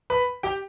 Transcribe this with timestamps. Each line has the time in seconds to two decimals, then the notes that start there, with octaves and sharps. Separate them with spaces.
0.10 B4 B5
0.43 G4 G5